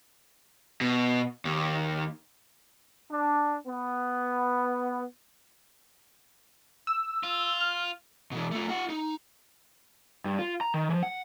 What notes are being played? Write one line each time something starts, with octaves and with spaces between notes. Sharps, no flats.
B2
D#2
D4
B3
E6
F4
F6
B2 E3
A3 F4
F4 F#5
D#4
G2
F4
A#5
D#3
E3 F3
F#5